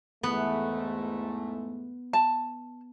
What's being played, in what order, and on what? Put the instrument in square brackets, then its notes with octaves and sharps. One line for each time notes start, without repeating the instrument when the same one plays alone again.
[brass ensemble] E2 G#2 A3 [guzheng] B3
[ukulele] A5